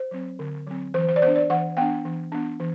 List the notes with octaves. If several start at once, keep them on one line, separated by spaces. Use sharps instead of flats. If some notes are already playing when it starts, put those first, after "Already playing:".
Already playing: C5
F#3 C4
D3
F#3 C4
E3 C5
C5
D5
B3 D4 C5
D5
E3 F#5
B3 D4 G5
E3
B3 D4
E3